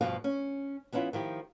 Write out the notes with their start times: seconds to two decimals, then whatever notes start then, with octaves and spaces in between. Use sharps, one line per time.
0.01 D2 G2 B2 F3 F5
0.24 C#4
0.92 E3 B3 C#4 E4 F4
1.13 D#3 F3 E4 G4